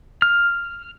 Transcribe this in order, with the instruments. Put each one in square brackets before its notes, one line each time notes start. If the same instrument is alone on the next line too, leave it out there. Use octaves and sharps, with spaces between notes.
[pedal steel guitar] F6